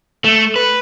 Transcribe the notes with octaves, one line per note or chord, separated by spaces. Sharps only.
A3
B4